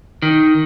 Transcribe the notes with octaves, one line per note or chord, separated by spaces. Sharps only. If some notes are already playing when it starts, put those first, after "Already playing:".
D#3